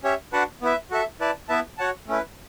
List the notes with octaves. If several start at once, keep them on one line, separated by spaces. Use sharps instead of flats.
C#4 G4 C#5 E5
D4 F#4 B4 F#5 A5
B3 E4 B4 E5
F#4 A4 E5
E4 B4 D5 A5
B3 E4 B4 E5 A5
F#4 C#5 F#5 A5
A3 C#4 E4 B4